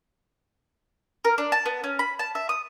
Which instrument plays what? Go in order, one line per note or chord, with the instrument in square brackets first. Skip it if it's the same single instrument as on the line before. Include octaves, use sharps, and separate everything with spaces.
[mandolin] A#4
D4
A5
B3
C#4
B5
A5
E5
D#6